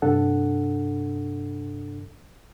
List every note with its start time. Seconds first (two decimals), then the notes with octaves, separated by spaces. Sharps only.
0.02 G2 C3 D4 A4 F#5